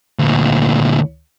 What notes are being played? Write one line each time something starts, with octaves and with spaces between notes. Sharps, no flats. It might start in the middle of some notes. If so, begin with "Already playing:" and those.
D2 A#2